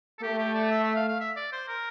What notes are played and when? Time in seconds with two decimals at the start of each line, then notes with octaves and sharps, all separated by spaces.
0.18 A4
0.23 A3 G4
0.39 G4
0.55 D5
0.71 E5
0.84 E5
0.96 F5
1.08 F5
1.20 E5
1.36 D5
1.52 C5
1.68 A#4